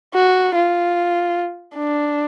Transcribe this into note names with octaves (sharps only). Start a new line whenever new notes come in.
F#4
F4
D4